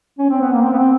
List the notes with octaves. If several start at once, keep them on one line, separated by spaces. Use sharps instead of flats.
C#4
C4
B3
A#3
C4
B3
C4